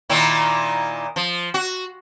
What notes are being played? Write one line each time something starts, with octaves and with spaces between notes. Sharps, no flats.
A#2 D#3 E4
F3
F#4